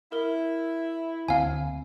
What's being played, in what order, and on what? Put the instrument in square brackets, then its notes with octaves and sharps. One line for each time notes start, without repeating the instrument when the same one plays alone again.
[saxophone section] E4 [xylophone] A#4 G7
[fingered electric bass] D2 A#3 C4 [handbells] F5 G#5